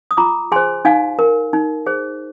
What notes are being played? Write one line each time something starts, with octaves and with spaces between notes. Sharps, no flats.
D#6
F4 A#5 D6
G#4 C5 G#5 C6
D#4 F5 G#5
A#4
D#4
G#4 C5